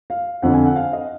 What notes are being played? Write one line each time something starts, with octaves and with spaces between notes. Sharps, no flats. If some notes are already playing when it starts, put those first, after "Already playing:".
F5
F2 D3 F#5
G#5
F#5
F5
D#5